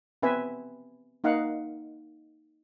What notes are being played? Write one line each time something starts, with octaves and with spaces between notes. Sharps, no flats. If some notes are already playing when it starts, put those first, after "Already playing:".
B3 C4 B4 E5 G#5
A#3 D#4 F5 F#5